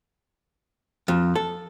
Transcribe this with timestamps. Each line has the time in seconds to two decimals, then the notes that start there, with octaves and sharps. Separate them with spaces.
1.08 F2
1.36 A4